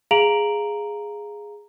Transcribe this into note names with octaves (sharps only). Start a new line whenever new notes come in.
G#4 F5 A#5 D7 F7 F#7